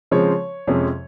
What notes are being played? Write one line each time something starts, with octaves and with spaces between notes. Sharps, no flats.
C#3 F3 G#3 C4 C#5
F2 C3 F3 G#3 C#4